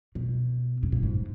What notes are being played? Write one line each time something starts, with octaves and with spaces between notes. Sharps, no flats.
B2
G#2
A#2
G#2